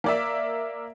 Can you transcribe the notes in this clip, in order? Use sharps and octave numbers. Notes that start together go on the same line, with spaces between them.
A#3 D5 E5